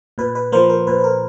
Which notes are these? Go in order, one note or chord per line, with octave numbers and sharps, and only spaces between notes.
A#2 B4
B4
F3 A#3 A#4 C5
A#4
A#2 B4
B4
A#4